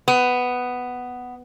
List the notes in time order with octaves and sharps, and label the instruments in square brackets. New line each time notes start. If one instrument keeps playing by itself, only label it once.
[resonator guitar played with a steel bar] B3